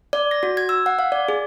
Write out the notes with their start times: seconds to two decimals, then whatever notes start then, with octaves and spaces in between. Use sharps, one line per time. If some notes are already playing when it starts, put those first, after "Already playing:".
0.13 D5
0.31 A#6
0.43 F#4
0.57 G#6
0.69 E6
0.86 F#5
0.99 F5
1.12 D5
1.28 G#4